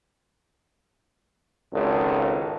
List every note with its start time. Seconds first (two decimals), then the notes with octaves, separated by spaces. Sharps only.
1.71 G#1 C#2 A4